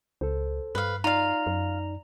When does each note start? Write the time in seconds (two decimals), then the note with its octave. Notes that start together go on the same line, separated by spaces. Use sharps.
0.21 C#2 A4 C5
0.75 G2 B4 F5
1.04 D#4 F4 D5 F5 A#5
1.47 F#2